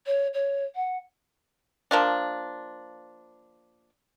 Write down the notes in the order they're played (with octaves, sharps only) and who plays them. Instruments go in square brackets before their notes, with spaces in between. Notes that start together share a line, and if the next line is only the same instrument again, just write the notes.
[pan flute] C#5
C#5
F#5
[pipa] F3 A#3 D4